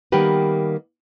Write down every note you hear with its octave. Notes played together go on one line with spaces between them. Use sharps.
D#3 G3 A#3 B3 G4 B4